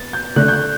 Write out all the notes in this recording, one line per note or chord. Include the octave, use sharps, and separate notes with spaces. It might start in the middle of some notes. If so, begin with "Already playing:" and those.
Already playing: B3 A6
G6
D3 A3 D4 F#6
G6
F#6